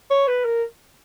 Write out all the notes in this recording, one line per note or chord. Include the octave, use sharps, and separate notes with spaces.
C#5
B4
A#4